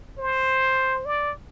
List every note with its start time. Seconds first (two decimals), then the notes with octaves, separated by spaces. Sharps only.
0.18 C5
1.06 D5